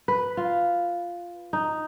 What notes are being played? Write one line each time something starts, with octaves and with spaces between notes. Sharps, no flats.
B4
F4
D#4